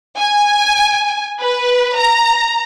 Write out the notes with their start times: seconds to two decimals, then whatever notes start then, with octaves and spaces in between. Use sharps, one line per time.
0.19 G#5
1.41 B4
1.97 A#5